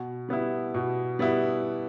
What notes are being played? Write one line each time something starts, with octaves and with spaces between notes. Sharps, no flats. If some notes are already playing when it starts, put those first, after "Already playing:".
Already playing: B2
G3 B3 E4
B2
G3 B3 E4